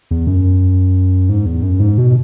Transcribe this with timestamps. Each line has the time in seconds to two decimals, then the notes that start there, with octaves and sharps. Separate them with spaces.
0.11 E2
0.27 F#2
1.29 G#2
1.46 E2
1.63 F#2
1.80 G#2
1.98 B2